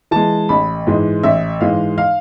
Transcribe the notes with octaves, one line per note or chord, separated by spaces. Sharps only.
E3 G#3 A5
A1 B5
G#2 E3 G#3
A1 E5
G#2 E3 G#3 F5
F5